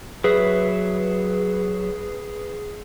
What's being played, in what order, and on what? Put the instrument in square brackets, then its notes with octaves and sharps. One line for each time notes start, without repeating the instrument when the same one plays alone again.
[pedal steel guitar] F#3 E5 [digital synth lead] G#4 [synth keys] B4